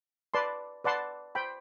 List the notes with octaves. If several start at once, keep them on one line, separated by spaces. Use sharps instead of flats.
B4 D5 A5 C6
B4 D5 F#5 A5 C6
C5 G5 B5